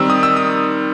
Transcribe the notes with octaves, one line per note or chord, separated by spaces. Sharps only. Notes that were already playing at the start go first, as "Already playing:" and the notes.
Already playing: D#3 G3 C4 E6
D#6
E6
D#6